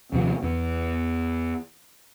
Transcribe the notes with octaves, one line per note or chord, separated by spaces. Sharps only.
D#2 C3 F3
E2 E3